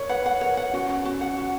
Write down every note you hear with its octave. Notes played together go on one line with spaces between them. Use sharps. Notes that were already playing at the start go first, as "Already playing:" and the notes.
Already playing: A#4 C#5
B4 F#5
F#5
A#4 C#5
F#5
C#4 F#4
F#4
F#4
F#5
F#4